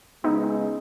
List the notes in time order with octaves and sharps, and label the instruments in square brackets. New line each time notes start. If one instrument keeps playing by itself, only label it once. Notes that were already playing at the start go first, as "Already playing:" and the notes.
[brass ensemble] C#3 G#3 [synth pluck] B3 D#4